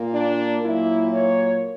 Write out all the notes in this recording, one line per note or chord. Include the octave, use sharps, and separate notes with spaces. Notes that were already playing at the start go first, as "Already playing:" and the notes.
Already playing: A#2 A#3
D4
A#2 F#3 A#3 E4
C#5